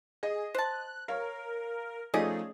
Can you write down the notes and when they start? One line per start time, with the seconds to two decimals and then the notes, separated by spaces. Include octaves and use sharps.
0.23 G#4 D#5
0.55 C5 A5 F#6
1.08 A#4 C#5 F5
2.14 F3 A3 C#4 D#4 G#4 D5 D#5